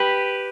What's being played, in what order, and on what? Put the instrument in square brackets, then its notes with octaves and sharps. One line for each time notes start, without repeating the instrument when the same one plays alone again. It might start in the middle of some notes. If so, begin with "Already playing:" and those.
Already playing: [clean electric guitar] G4 B4